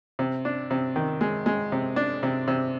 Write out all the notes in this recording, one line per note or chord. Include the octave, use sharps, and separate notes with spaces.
C3
D4
C3
D#3
G#3
G#3
C3
D4
C3
C3